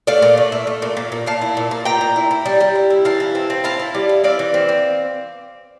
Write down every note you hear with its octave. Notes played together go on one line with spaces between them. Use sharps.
A3 D5 F5
A#2
A3
E4
A3
A#2
A#2
A#2
A#2 F5 A5
E4
A#2
A#2
A#2 G5 A#5
A#2
E4
E4
G3
G3
E4
E4
E3 F5 A5
E4
C4
C4
E4 F5 A5
E4
G3
E4
C4 D5 F5
E3
C4
C4